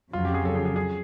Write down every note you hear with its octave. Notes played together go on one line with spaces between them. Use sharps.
F2 C#3 F#3 F4
G4
G#4
A4
G#4
G#4
G#4